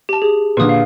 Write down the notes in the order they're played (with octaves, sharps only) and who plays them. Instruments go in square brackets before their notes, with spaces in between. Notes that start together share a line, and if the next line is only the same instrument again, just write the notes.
[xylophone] G4 A5
G#4
[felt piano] A#2 D3 [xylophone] B4 D#6
[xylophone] F5